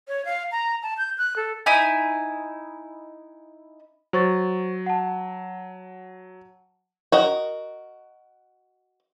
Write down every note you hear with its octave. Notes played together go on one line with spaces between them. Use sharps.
C#5
F5
A#5
A5
G6
F#6
A4
D#4 E4 G#5
F#3 C5 C#6 A6
F#5 A5
F#4 A#4 D#5